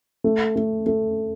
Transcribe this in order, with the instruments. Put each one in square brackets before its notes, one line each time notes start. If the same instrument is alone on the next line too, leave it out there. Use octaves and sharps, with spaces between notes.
[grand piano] A3
A3
A3